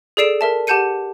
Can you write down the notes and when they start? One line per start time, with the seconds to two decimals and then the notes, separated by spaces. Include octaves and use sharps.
0.17 G#4 A4 D5 C7 D7 E7
0.41 A#4 E5 A5
0.67 G4 F#5 A5 G6 C#7 D#7